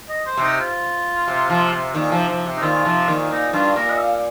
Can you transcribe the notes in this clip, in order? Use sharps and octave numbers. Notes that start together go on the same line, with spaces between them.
D#5
C5
C3 D#4
F4
C3
C3 F3
C3
A#2 D#3
C3 F3
C3 F3
C3
D#4
A#2 D#3 F4
C3 F3
A#2 D#3
A#2 D#4
G2 F4
A#2 A#4
D#5
F5